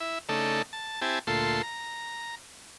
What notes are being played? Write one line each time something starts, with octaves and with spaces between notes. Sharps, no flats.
E4 E5
C#3 A3 D4 D#4 A4
A5
C4 E4 G4 G#5 A5
D2 A#2 A3 F4 A4 C6
A#5